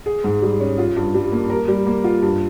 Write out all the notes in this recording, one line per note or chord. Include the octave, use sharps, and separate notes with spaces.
G#4
G#2
G3
C#4
F4
G2
G3
A#3
A#4
G3
A#3
F4
G2